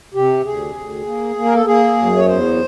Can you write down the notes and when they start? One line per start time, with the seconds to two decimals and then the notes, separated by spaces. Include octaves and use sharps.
0.14 C3 G4
0.45 D2 G#4
0.75 D2
1.06 A#3
1.36 A#3
1.45 A#4
1.55 A4
1.66 A#3 G#4
1.96 F#2
2.16 C#5
2.25 E2 C5